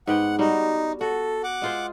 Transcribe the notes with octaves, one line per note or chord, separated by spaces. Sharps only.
G#2 B3 F#5 G5
G3 D#4 F#4
F#4 A4
F#5 D6
G#3 F4 C5